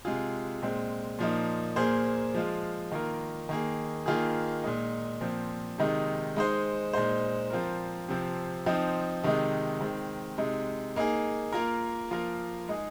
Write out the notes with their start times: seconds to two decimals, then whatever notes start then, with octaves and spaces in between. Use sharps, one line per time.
0.05 C3 G#3 F4 G#4
0.62 A#2 G#3 C4
1.19 A#2 F3 A#3 D#4
1.76 A#2 A#3 G#4 C5
2.34 F3 G#3 F4
2.91 D#3 A#3 F4 A#4
3.49 D#3 A#3 G#4
4.06 D#3 A#3 F4 G#4
4.64 A#2 G#3 D#4
5.21 A#2 F3 C4
5.78 C3 D#3 G#3 D#4
6.36 G#3 D#4 C5
6.93 A#2 G#3 D#4 C5
7.50 F3 C4 F4 A#4
8.08 C3 F3 C4
8.66 F3 C4 D#4
9.23 C3 D#3 G#3 D#4
9.81 D#3 G#3 C4
10.38 C3 G#3 D#4
10.96 A#3 D#4 G#4
11.53 A#3 F4 A#4
12.11 F3 A#3 F4 A#4
12.68 G#3 D#4 G#4